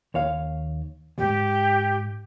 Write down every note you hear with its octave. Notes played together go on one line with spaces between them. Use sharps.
D#2 C#5 F5
D2 G#2 G4